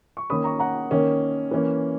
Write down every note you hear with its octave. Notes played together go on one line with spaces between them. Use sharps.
C#6
D#3 A#3 C#4 B5 D#6
A#5 C#6
F#5 A#5
D#3 A#3 C#4
E3 A#3 C#4